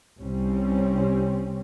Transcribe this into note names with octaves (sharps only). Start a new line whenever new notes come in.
C2 C3 G3 C4 C#4